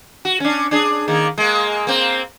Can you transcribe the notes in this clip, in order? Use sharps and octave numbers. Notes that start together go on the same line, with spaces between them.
F#4
C#4 D4
D4 G#4
D#3 A#3
G#3 A#3
A#3 C4